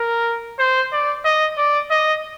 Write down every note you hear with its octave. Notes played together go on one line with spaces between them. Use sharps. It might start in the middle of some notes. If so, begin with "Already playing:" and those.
Already playing: A#4
C5
D5
D#5
D5
D#5